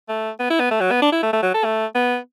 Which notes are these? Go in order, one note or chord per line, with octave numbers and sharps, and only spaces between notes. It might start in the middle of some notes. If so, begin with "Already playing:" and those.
A3
B3
E4
B3
A3
F#3
B3
D4
E4
A3
A3
F#3
A4
A3
B3